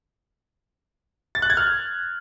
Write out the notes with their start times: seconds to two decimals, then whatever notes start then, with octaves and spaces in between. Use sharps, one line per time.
1.35 A6
1.42 F#6
1.50 G#6
1.57 F6